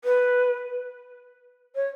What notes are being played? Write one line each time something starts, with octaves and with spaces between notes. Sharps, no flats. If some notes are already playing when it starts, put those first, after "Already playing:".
B4
C#5